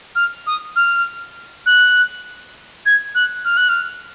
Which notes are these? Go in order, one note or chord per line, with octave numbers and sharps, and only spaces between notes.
F6
D#6
F6
F#6
G#6
F#6
F6
F#6
F6